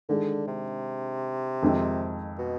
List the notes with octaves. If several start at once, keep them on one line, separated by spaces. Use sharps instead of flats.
D3 D#3 G#3 D4 G#4
C3
F2 D#3 G#3 C4 D#4
B2